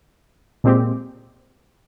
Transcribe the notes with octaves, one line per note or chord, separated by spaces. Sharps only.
A#2 G#3 C4 G4